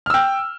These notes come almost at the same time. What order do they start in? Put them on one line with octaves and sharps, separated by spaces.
F6 E6 G5